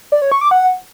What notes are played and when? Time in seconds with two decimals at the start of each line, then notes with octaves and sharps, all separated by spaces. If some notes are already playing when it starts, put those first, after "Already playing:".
0.12 D5
0.22 C#5
0.32 C#6
0.41 D6
0.51 F#5